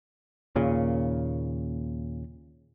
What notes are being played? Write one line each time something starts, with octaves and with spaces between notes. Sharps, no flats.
D#2 A#2 C#3